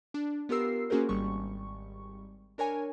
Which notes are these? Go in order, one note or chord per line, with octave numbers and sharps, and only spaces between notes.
D4
B3 F4 G4 A#4 E6 C7
A#3 C#4 F#4 G#4 A#4 C5
G#1 G3 C#6
D4 A#4 C#5 G#5